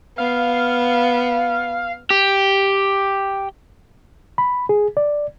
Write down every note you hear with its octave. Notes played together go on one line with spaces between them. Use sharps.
B3 F5
G4
B5
G#4
D5